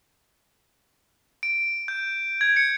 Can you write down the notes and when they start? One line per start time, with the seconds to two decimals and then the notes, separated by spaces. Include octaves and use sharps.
1.43 D7
1.88 G6
2.41 G#6
2.56 C#7